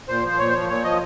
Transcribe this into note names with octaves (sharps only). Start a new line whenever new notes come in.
A#2 C5
F3 C5
A#2 C#5
C5
F3 C#5
A#2 C#5
F3 D#5